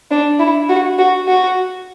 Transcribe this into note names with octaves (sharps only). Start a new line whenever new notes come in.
D4
E4
F#4
F#4
F#4